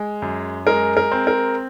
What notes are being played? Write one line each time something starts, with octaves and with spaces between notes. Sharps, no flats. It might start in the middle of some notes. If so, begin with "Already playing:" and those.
Already playing: G#3
F#2
G#3 A#4
A#4
C4
A#4